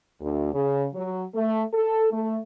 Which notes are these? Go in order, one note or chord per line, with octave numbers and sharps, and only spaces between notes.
D2
C#3
F#3
A3
A4
A3